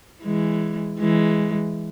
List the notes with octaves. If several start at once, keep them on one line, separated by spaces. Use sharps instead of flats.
E3 G#3
E3 G#3